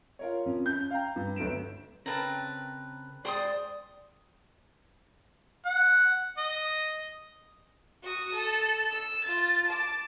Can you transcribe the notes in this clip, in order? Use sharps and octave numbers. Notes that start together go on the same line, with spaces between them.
F4 A#4 C#5
F2 F3 C#4
C#4 G6
F5 G5 A#5
G2
D2 F#3 B3 A4 D7 E7
C#3 C4 A#4 B4 A5 A#5
G#2 G#4 C5 D5 G5 C6 D#6
F#5
D#5
F#4 D#6
A4
E6
F4 A6
A5 D6